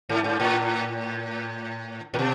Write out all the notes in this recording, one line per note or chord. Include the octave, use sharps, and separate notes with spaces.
G#2
G#2
A2
A2
B2